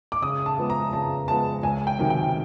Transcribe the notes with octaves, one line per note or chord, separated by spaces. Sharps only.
D6
C#3 D#6
A5
F3 G#3 B3
A#5
C#3 A5
F3 G#3 B3 A5
C#2 G#5
G5
C3 D#3 F#3
G5